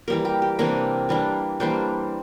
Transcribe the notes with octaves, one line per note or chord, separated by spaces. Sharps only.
E3 G3 A#3 A#4
G4
G4
C3 E3 A#3 D4 A#4
E3 G3 A#3 D4
E3 G3 A#3 D4 C5